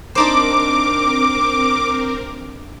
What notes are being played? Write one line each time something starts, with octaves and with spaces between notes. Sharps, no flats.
C4 D4 D#4 A#4 C5 D6